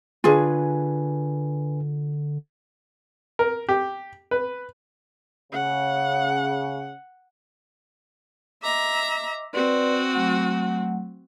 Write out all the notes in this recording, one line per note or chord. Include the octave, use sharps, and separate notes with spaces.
D3 D4 F4 G#4 B4 G#5
A#4
G4
B4
C#3 F#5
D#5 E5 A#5 D6
C4 F#4 B4 D5 C6
F#3 A3 F#5